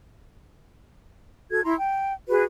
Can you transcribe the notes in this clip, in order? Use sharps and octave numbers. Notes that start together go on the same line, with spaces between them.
F#4 A4 G#6
E4 A#5 C6
G5
F#4 G#4 B4